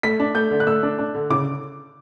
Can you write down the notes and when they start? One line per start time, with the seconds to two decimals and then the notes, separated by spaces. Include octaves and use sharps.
0.03 A3 B6
0.20 D4
0.35 A3 G6
0.51 D3
0.60 F#6
0.67 A3 E6
0.83 D4
0.99 D4
1.15 D3
1.30 C#3 D6